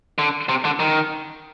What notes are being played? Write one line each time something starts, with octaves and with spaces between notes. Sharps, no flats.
D3
C3
D3
D#3